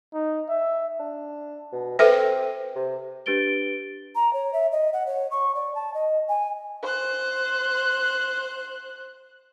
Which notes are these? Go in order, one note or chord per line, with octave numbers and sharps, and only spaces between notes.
D#4
E5
D4
B2
C4 A4 B4 E5
C3
D4 G4 B4 A6 D7 G7
A#5
C#5
E5
D#5
F#5
C#5
C#6
D5
A5
D#5
G#5
C5 F#6